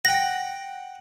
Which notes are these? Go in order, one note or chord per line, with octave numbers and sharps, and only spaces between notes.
F#5 G5 A#6